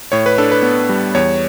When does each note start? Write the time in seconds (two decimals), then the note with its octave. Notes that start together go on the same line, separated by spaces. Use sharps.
0.12 A2 C#5
0.26 B4
0.38 D4 A4
0.51 B4
0.63 B3
0.89 G3
1.15 E2 C#5